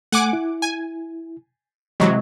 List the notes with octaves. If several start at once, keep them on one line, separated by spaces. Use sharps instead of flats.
A3 F#5 G#5 D6
E4
G#5
C3 E3 F#3 G#3 D#5 C#6